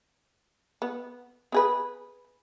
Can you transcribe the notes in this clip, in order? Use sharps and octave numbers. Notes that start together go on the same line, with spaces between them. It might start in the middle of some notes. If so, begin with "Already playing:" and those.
B3
B3 G#4 B4